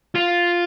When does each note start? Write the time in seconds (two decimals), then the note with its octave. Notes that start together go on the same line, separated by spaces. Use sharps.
0.15 F4